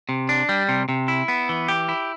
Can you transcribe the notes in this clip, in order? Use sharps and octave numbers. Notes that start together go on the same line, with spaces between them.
C3
D4
G3
C3
C3
E4
B3
E3
G4
E4